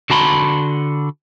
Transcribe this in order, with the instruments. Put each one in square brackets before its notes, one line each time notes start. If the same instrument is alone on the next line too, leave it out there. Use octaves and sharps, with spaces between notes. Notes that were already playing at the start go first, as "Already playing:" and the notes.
[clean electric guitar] D3 F#4 A5 B5 C6